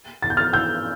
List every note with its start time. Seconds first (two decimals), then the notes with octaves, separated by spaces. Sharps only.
0.22 A6
0.30 G6
0.37 F6 A6
0.53 E6 G6